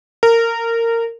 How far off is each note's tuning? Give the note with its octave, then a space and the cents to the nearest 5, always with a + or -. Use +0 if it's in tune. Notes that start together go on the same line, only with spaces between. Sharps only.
A#4 -20